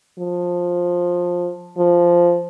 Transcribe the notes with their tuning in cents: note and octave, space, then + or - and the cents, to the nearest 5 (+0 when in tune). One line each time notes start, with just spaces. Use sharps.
F3 +15
F3 -5